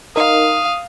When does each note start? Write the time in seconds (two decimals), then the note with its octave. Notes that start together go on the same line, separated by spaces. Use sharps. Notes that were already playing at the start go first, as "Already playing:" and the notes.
0.16 D#4 A#4 F5 D#6